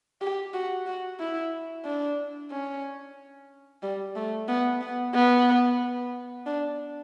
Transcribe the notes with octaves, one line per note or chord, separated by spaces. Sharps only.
G4
F#4
F#4
E4
D4
C#4
G3
A3
B3
B3
B3
D4